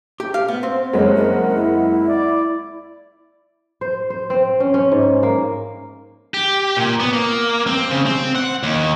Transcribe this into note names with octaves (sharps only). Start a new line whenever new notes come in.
G4
F5
B3
C4
F#1 G#3 C4 C#5 F#5
A#4
E4
D5
C5
C5
C4
C#4
C#4
G#2
A#3
G4
A#2
B3
A#3
C4
C#3
C4
F#5
D#2